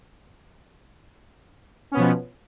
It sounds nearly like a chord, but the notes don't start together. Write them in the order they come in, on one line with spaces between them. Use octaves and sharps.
C#4 B3 B2 F3